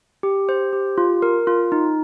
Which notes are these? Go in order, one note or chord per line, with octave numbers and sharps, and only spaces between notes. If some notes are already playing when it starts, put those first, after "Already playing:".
G4
C5
G4
F4
A#4
F4
D#4